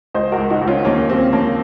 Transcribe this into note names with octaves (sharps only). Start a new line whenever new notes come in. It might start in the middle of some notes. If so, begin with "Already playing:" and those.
C#2 C5 D#5
F#4 A#4
C#2
D#4 F#4
C#2
C#4 F4
D#2 A#3 C#4
D#2 C4
F3 A#3 C#4